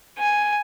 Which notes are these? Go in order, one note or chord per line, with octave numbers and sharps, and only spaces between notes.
G#5